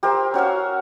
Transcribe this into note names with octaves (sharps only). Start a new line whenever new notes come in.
G4 A#4 C5 E5
C#4 F#4 E5 F5